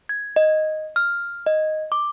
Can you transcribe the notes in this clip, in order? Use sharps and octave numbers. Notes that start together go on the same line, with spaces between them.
G#6
D#5
F6
D#5
D6